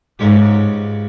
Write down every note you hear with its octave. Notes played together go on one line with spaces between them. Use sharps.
C#2 G#2 C#3 G#3 C#4 G4